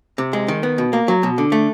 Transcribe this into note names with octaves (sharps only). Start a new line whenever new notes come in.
C3
G#3
D#3
B3
B2
A#3
F#3
B2
D3
A3